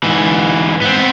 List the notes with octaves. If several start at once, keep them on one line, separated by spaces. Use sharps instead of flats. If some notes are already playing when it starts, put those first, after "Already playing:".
G#2 E3
B3 C4